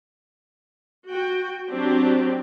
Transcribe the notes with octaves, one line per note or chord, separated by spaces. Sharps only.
F#4 G5
F#3 C4 D4 F#4 G4